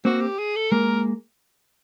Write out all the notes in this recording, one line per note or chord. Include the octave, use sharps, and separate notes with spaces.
A#3 C4 F#4
G4
G#4
A4
G#3 A#3 A#4